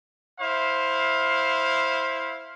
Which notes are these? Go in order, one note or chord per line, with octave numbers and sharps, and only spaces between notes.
E4 C5 F5